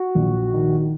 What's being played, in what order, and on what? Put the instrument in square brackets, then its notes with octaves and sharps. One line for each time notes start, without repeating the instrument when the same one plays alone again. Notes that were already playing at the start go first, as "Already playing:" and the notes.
Already playing: [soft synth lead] F#4
[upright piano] A#1
D#3